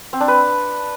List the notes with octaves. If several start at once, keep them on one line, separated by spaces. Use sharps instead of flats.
C4
D4
B4